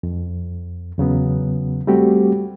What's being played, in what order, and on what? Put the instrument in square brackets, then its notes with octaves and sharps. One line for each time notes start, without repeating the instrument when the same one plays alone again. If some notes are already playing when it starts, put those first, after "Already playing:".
[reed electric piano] F2
E2 C#3 F#3 B3
G3 A3 C4 F#4 G4